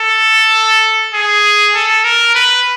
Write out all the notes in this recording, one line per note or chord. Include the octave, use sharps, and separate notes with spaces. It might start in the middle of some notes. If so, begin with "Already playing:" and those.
Already playing: A4
G#4
A4
A#4
B4